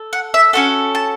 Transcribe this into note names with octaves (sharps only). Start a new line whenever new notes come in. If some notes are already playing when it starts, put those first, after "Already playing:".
Already playing: A4
F#5
E5
C#4 F#4 A4 F#5
A5